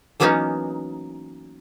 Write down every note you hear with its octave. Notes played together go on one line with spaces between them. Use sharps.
E3 F#3 A#3 B3 C#4 D#4